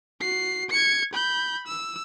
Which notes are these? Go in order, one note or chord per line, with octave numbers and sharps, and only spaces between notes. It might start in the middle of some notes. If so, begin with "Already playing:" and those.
F#4 C7
G#6 C#7
B5 G6
E6